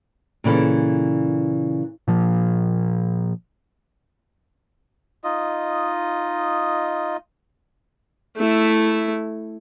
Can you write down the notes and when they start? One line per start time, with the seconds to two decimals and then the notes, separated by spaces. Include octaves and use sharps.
0.44 A#2 C#3 E3 A4
2.08 A#2 F3
5.24 D#4 F4 D#5
8.37 A3 E4